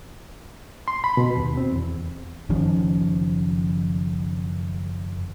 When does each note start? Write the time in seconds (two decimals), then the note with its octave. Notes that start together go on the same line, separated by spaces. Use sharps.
0.88 C6
1.04 B5
1.17 B2
1.37 D#2
1.57 C4
1.72 E2
2.50 F#1 D#3 F3 C#4